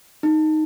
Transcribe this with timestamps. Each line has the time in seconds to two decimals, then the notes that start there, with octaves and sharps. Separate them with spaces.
0.23 D#4